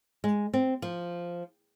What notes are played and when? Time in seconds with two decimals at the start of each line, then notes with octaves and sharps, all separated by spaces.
0.24 G#3
0.54 C4
0.82 F3